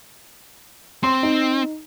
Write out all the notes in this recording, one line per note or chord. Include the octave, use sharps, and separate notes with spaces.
C4 C6
D#4